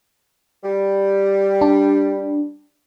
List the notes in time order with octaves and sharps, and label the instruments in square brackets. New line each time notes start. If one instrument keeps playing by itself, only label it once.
[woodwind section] G3
[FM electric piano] D4